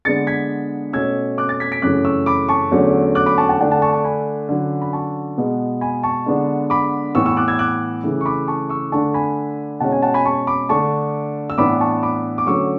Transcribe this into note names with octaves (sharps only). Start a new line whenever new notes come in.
D3 G#3 B3 D4 A6 C#7
G#6 B6
B2 A3 C#4 E6 G#6
D6 F#6
F#6 A6
G#6 B6
B6 D7
F#2 C#3 E3 A3 D6 F#6
C#6 E6
B5 D6
A5 C#6
E2 D3 F#3 A3 C#4
D6 F#6
B5 D6
A5 C#6
F#5 A5
D3 A3 D4 F#5 A5
F#5 A5
A5 C#6
A5 C#6
G#5 B5
D3 F#3 C#4
B5
A5 C#6
B2 G#3 B3
G#5 B5
A5 C#6
D3 G#3 B3 D4
B5 D6
A2 E3 B3 C#6 E6
C#6 E6
D6 F#6
E6 G#6
D6 F#6
C#3 E3 A3
C#6
B5 D6
A5 C#6
C#6 E6
D3 A3 D4 A5 C#6
G#5 B5
B2 G#3 C#4 F#5 A5
G#5
F#5 A5
G#5 B5
A5 C#6
B5 D6
D3 A3 D4 A5 C#6
E6
A2 E3 B3 D4 B5 D6
A5 C#6
B5 D6
D6
D3 F#3 A3 C#4 C#6 E6